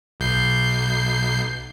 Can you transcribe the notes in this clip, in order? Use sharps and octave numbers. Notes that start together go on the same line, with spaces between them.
B1 G6 C7